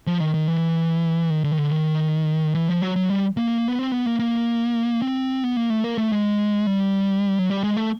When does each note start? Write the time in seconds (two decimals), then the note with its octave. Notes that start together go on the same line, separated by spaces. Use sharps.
0.07 F3
0.20 D#3
0.34 D#3
0.48 E3
1.30 D#3
1.44 D3
1.52 D#3
1.58 D3
1.71 D#3
2.54 E3
2.68 F3
2.82 F#3
2.96 F#3
3.10 G3
3.37 A#3
3.68 B3
3.79 C4
3.92 B3
4.06 A#3
4.19 A#3
5.02 C4
5.44 B3
5.57 A#3
5.70 A3
5.84 A#3
5.98 A3
6.12 G#3
6.67 G3
7.39 F#3
7.50 G3
7.63 G#3
7.76 A3